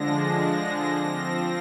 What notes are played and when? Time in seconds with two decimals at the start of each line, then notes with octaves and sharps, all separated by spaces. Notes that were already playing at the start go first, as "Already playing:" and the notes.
Already playing: D3 F3 G#3 D4 A#6
0.37 A#6
0.94 F3 C4